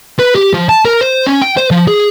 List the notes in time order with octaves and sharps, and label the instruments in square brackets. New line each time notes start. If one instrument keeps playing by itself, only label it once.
[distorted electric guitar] B4
G4
F3
A5
A#4
C5
C#4
G5
C5
F3
G#4